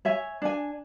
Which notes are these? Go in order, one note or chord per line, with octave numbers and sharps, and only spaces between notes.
C#5 E5 G#5
D4 G#5